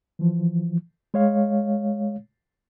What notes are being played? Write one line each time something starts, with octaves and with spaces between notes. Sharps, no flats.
E3 F3
G#3 C#5 F5